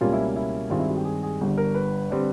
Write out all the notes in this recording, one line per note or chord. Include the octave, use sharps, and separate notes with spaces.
C#2 B2 G3 A#3 C#4 F4
E4
E4
G2 D#3 G#3 C4 F4
E4
F#4
G4
G#4
G#4
G1 G2 D3 G3
A#4
B4
D3 G3 C4